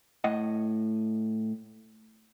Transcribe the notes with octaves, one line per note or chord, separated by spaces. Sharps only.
A2 D#5 F#5